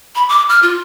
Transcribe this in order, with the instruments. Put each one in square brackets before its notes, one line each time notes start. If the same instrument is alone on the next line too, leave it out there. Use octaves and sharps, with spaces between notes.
[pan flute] B5
D6
F6
F4